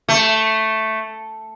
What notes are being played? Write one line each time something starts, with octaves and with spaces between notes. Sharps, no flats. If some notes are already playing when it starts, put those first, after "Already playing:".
A3